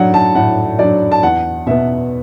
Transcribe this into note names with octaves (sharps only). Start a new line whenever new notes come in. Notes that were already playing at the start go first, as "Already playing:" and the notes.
Already playing: A2 F#3 D4 D5 F#5
A5
A2 F#5
F#3 D4 D5
A5
E2 F#5
B2 B3 E5